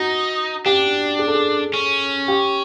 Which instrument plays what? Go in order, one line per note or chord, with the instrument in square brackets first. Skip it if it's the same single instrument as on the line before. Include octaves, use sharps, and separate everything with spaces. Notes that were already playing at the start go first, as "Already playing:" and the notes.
Already playing: [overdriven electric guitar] D#4 [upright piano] F#4
[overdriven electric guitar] D4 [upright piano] G4
[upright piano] G#4
A4
G#4
[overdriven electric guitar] C#4
[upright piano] G4